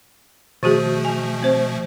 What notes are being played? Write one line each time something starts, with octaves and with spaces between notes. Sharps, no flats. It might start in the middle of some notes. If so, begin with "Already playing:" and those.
B2 D#3 F3 A3 F#4 G#4
G#5
C4 C5